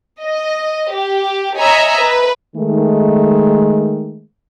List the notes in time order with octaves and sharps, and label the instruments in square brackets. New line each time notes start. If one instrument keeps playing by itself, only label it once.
[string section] D#5
G4
C#5 D#5 E5 G#5 A#5 B5
B4
[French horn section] D#3 G#3 A3